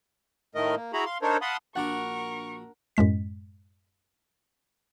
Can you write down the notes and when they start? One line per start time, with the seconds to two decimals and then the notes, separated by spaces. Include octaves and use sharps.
0.55 A2 D#3 A3 A#4 D#5
0.75 A#3
0.93 E4 F#4 G#4 A#5 B5
1.05 F5 C6
1.22 D4 D#4 A4 A#4 C5 C#5
1.41 F5 F#5 A5 B5 C6 D#6
1.76 A#1 D4 F#4 A#4 F#5 B5 C#6
2.97 F#2 A2 G#3 B6